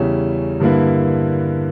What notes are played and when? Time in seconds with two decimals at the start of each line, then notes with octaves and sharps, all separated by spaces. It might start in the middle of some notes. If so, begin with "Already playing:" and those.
Already playing: E2 C#3 G3 C#4 E4
0.60 G2 D3 A#3 E4 B4